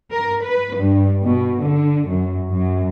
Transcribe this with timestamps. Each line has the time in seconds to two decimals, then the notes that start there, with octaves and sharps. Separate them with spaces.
0.12 A#4
0.43 B4
0.75 G2
1.21 B2
1.60 D3
2.07 F#2
2.52 F#2